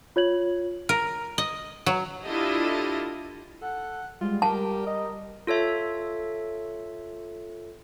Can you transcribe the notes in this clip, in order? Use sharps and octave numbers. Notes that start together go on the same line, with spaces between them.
F4 C#5 G#6 F#7
A#4
D#5
F#3
D4 E4 F4 G4 A4 D#5
A4 F#5
G3 G#3 F4
G4 A#4 A5
D#5
F4 A4 C#5 E5